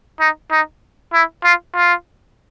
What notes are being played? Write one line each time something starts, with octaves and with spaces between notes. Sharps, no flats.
D#4
D#4
E4
F4
F4